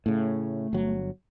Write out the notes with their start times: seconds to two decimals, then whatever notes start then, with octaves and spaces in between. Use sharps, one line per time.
0.06 A2 C#3 A3
0.73 G1 F#3